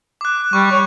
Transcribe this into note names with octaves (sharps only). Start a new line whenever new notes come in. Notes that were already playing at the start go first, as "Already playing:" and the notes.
D6 F#6
G3 C#6
C#5